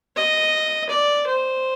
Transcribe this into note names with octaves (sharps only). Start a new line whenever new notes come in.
D#5
D5
C5